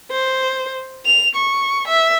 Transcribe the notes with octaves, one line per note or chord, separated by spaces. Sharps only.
C5
F7
C#6
E5